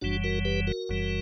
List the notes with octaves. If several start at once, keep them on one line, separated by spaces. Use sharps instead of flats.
F#1 F#2 E3 G3 D4 F#4
F#4 A#4
G4 B4
F#4 A#4
F#1 F#2 E3 G3